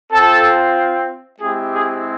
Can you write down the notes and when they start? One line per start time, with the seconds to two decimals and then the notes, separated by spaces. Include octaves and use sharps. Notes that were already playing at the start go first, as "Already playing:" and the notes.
0.11 C4 F4 A4
1.40 G#3 C4 E4 G4 G#4
1.72 G#4